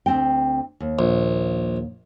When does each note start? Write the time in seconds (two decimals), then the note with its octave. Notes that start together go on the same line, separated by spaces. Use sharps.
0.06 D2 C4 G5
0.80 D#2
0.99 A#1